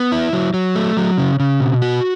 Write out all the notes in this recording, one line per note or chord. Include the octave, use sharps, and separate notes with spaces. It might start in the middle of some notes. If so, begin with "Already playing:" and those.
Already playing: B3
E4
F#3
F#3
A3
F#3
C#3
C#3
B2
F#4